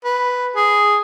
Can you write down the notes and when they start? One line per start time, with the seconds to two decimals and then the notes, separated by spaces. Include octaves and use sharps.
0.04 B4
0.56 G#4